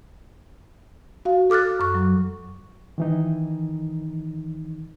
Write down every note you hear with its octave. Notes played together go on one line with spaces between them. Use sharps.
F#4 F5
A4 D6 F6 F#6 A6
F#2 C#6
F#3
D#3 E3 D#4